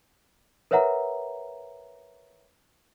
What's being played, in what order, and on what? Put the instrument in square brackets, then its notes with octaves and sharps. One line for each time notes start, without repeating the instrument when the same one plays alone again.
[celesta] A#4 B4 C#5 E5 F#5 A#5